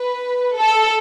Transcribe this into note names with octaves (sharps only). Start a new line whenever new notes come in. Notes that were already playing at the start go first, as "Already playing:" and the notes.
Already playing: B4
A4